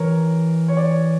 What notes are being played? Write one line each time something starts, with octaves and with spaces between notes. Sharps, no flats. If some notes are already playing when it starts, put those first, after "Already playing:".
Already playing: E3 A#4 C#5
C#5
D5
C#5